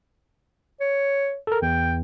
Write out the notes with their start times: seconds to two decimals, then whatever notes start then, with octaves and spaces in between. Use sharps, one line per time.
0.81 C#5
1.47 A4 A#4
1.62 E2 G5